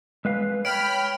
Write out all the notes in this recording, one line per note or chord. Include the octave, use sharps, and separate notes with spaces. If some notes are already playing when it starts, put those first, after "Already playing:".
G#3 B4 F5
C#5 G5 B5 F6 D7